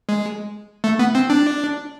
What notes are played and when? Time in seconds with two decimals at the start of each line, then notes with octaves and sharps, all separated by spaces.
0.09 G#3
0.84 A3
0.99 B3
1.15 C4
1.30 D4